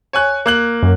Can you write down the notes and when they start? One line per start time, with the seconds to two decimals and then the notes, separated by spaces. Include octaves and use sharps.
0.13 C#5 G#5 F#6
0.46 A#3 F#6 F#7
0.83 F#2